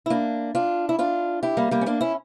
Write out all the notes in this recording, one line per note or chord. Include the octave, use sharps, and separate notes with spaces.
E4
A#3 D4
D4 F4
E4
D4 F4
E4 G4
G3 A#3
G3 A#3
C#4
A#3 D4
C#4 E4